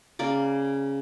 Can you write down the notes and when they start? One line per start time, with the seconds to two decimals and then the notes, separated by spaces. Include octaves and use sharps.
0.19 C#3 A#3 D5